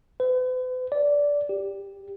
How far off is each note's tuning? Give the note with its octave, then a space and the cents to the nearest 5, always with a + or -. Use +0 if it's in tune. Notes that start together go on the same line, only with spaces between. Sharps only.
B4 +45
D5 -15
G4 +10